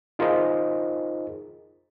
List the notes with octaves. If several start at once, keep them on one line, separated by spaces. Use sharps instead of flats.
D#4 F4 G#4 A#4 C5 D#5